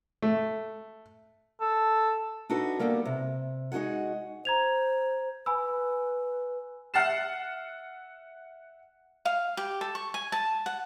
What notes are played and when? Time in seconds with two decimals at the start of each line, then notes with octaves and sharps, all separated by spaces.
0.22 A3
1.61 A4
2.49 D4 D#4 F#4 A4 B4
2.79 G3 A#3 B3 G4 A4
3.05 C3
3.72 G#3 D#4 F#4 G#4 F#5
4.45 C5 A#5 G#6 F7
5.46 B4 G#5 B5 E6
6.94 E5 F#5 F6 A6 C7 E7
9.25 F5
9.57 G4
9.81 A4
9.95 C#6
10.14 G#5
10.32 A5
10.66 F#5